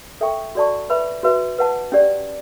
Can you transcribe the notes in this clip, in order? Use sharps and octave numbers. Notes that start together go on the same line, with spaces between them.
A4 E5 G5 C#6
F#4 A4 D5 A5 C#6
B4 E5 B5
F#4 B4 E5
B4 F#5 A5
C#4 G4 D5